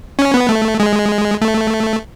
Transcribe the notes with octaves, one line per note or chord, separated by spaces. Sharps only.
C#4
B3
A3
G#3
A3